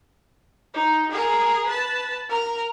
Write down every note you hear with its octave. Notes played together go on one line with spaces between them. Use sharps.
D#4
G#4 A#4
B4 A5
A#4 A#5